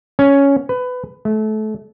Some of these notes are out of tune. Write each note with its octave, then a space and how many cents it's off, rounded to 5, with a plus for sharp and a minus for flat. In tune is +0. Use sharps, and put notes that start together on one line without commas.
C#4 +5
B4 +20
A3 -30